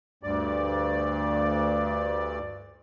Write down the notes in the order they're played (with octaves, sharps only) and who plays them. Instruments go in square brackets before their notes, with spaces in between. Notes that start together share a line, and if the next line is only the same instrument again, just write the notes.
[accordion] D2 G2 D5